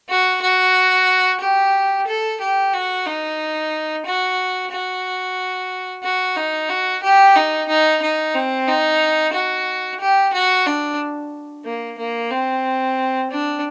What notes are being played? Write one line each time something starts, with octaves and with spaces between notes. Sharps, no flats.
F#4
F#4
G4
A4
G4
F#4
D#4
F#4
F#4
F#4
D#4
F#4
G4
D#4
D#4
D#4
C4
D#4
F#4
G4
F#4
D4
A#3
A#3
C4
D4